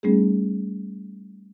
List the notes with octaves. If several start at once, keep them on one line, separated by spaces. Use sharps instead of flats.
G3 A3 B3 C#4 D#4 G#4